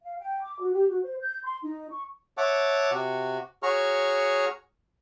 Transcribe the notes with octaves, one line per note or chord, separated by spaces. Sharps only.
F5
G5
D6
F#4
G4
F#4
C5
G6
C6
D#4
C#6
C#5 E5 F#5 A5 D6
C3 F#4
F#4 G#4 C#5 A#5 C#6 F6